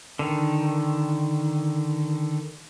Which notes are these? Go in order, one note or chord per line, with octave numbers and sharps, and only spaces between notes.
D3 D#3